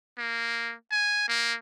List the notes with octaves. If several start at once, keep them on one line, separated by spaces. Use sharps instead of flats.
A#3
G#5
A#3